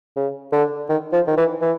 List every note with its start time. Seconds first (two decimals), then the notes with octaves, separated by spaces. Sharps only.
0.16 C#3
0.52 D3
0.89 D#3
1.12 F3
1.27 D#3
1.37 E3
1.61 E3